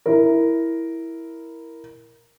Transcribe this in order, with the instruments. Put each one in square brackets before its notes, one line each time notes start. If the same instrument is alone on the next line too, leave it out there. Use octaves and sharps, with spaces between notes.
[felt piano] E4 A#4